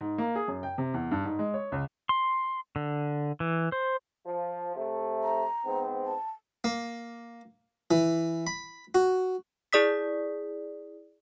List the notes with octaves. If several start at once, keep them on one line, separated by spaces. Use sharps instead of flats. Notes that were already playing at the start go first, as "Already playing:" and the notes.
G#2
A#3
G#4
F#2
G5
C3
E2
G2
G#2
G#3
C#5
C#2
C6
D3
E3
C5
F3
C3 A3
A#5
G#2 B3 C4
A5
A#3
E3
B5
F#4
E4 G#4 D5 D#6 B6